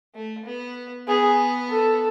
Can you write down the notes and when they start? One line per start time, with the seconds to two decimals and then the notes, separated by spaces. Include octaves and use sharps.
0.15 A3
0.45 B3
1.07 B3 G#4
1.70 A4